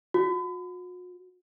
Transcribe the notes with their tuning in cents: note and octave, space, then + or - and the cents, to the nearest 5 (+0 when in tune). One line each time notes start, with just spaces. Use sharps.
F#4 -40